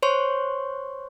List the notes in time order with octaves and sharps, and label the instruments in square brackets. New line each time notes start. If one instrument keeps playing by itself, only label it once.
[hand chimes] C5 C#5 C6 C#6